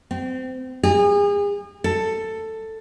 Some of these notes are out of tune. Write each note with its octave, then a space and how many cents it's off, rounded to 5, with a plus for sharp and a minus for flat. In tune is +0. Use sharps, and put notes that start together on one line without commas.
C4 -25
G#4 -35
A4 +10